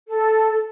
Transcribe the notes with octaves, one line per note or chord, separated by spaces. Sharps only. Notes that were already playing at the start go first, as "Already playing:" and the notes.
A4